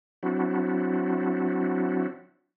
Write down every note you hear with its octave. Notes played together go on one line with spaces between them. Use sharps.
F#3 C4 D4 E4 F#4